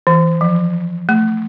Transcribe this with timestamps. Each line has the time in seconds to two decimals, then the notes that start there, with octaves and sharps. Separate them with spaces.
0.07 E3
0.41 F3
1.09 A3